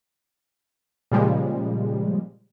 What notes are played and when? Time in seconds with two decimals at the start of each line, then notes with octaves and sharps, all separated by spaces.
1.12 A#2 C#3 F3 G3 G#3